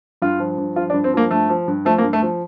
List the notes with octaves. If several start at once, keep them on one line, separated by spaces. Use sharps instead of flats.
G2 F4
F3
G2
F3 F4
D4
G2
C4
F3 A#3
G2 A3
F3
G2
F3 A3
A#3
G2
A3
F3